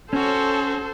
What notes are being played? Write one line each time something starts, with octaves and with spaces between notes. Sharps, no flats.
C#4 F#4 A4 C5 C#5